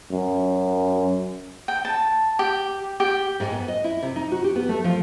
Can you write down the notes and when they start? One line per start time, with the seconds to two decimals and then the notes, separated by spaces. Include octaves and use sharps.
0.12 F#2
1.68 G5
1.85 A5
2.39 G4
3.00 G4
3.40 G#2
3.52 B3
3.68 D#5
3.84 E4
4.03 C3
4.16 D#4
4.32 F#4
4.44 G4
4.56 B3
4.69 A3
4.84 F3